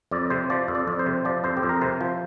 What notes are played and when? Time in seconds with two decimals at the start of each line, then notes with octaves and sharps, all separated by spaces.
0.11 F2 D5
0.30 C3 C5
0.50 F3 D5
0.68 F2
0.75 D5
0.88 F2
0.99 C5
1.06 C3
1.25 F3 D5
1.44 F2 C5
1.57 G4
1.63 F2
1.69 A#4
1.81 C3 C5
2.01 F3